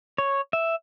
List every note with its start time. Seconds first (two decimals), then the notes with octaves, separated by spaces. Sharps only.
0.18 C#5
0.53 E5